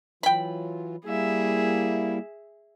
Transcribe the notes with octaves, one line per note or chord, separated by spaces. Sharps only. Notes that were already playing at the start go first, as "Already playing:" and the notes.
E3 F#3 F4 G5 B5
G3 A#3 E4 G#4 E5